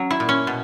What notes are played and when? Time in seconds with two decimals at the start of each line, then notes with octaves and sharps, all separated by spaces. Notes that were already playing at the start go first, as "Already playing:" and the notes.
Already playing: F#3 C#4
0.11 E4
0.20 A#2
0.29 C#4
0.47 B2